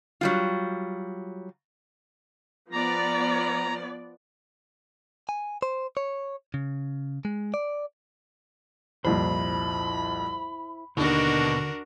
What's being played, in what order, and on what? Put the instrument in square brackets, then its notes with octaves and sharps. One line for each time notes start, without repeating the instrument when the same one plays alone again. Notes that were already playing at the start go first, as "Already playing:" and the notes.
[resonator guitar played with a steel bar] F#3 G3 F4
[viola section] F3 B3 D5 [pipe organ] A#5
[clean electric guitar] G#5
C5
C#5
C#3
G#3
D5
[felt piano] C2 F2 A#2 [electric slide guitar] E4 C5 [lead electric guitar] B5
[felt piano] D#2 [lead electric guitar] B2 [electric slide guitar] D3 [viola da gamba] D4 F#4 A#4